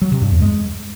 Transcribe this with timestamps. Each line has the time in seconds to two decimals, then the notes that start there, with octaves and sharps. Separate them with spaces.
0.02 F#3
0.12 C3
0.22 G2
0.32 E2
0.42 G#3